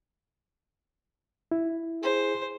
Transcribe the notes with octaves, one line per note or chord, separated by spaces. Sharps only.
E4
G#4 C5